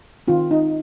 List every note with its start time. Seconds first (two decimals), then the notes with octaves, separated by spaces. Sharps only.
0.28 D#3 C4 F4
0.51 D#4